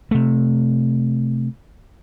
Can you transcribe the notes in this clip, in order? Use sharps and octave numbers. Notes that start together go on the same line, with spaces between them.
C3 A3